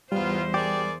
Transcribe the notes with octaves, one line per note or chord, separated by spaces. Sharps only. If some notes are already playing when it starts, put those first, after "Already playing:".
E2 G#2 G3 B3 F4 C5
G4 G#4 A#4 D5